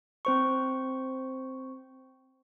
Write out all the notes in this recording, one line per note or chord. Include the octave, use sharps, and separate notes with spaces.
C4 C5 C#6